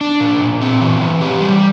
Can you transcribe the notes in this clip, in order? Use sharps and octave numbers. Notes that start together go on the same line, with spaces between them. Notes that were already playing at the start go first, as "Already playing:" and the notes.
D4
A#2
A#2
C4
E3
E3
G4
G3